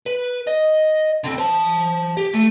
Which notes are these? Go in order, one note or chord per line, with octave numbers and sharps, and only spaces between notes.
B4
D#5
D3 C4
C5 A5
G4
A3